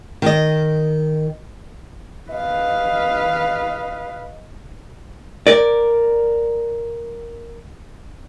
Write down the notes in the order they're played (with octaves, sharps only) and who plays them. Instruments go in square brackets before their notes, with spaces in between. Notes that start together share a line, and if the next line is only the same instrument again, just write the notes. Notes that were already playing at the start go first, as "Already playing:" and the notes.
[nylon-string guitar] D#3 D#5
[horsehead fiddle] B4 F5 [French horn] D#5
[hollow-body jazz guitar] A#4 D5